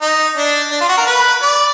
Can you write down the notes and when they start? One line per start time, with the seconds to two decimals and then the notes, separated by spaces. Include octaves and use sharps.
0.01 D#4
0.37 D4
0.71 D4
0.81 F4
0.89 F#4
0.97 A#4
1.06 B4
1.42 D5